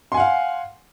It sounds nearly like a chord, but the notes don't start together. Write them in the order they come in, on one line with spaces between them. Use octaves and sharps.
C6 G#5 F#5 F5